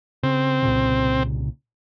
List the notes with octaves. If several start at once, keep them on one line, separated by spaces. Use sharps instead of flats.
C#3 C4
C2 A#2 C#3